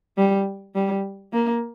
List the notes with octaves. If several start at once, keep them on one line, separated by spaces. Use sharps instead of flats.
G3
G3
A#3